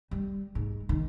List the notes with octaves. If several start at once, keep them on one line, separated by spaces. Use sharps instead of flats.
G3
G#2
D#3